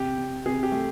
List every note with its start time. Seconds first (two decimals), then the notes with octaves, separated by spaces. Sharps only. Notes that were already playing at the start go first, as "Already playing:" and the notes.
Already playing: C3 G4
0.18 C3
0.46 C3 G#4
0.63 G4
0.72 A3